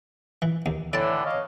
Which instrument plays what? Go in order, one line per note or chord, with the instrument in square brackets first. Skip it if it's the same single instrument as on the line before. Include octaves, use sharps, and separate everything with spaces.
[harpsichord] E3
D#2
[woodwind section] A2 D3 E3 [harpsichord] D5 A5
[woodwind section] C#5 D#5 F5